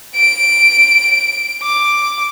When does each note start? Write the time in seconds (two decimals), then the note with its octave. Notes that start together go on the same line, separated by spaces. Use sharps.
0.15 D7
1.62 D6